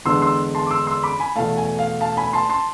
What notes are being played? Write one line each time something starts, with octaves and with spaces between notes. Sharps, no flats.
E2 D3 G#3 B3 D4 C6 E6
C6 E6
A5 C6
D6
C6 E6
C6 E6
B5 D6
G#5 B5
E2 B2 A3 F5 A5
G#5
F5
F5 A5
G#5 B5
A5 C6
A5 C6